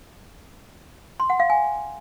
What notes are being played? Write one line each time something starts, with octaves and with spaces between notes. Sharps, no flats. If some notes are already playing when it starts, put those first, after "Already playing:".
C6
F#5
F5
G#5